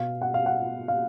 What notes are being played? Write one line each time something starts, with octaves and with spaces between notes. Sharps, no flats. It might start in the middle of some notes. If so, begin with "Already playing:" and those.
Already playing: B2 F5
F#5
F5
F#5
F5